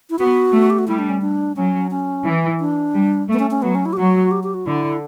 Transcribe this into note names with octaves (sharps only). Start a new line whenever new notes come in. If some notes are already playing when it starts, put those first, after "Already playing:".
E4
B3 F#4
A3
G4
F#4
G3 E4
D4
C#4
D4
F#3 C#4
C#4
E3
D4
G3
A3 B3
C#4
C#4
F#3 B3
C#4
E4
G4
F#3 F#4
G4
G4
F#4
D3 E4